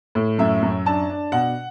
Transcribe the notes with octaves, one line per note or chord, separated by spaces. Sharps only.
A2
F#2 E5
F#2
D4 A5
D4
B2 F#5